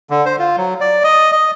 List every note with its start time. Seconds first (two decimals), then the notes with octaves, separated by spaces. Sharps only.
0.10 D3
0.26 C5
0.39 F4
0.57 F#3
0.81 D5
1.04 D#5
1.32 D#5